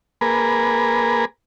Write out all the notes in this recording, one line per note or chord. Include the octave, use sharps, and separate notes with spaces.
A#3 G#4 A#4 B4